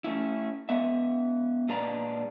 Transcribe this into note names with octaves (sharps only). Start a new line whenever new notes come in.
A3 C#4 E4
G#3 B3 E5
A#2 G#3 D4 B4 D5 A#5